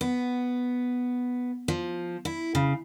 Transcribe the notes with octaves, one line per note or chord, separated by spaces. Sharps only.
B3
F3
E4
C#3